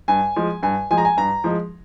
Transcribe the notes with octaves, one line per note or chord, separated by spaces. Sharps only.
G2 G#5
F3 G#3
G2 G#5
F3 G#3 G#5
A#5
G#5
G2 A#5
F3 G#3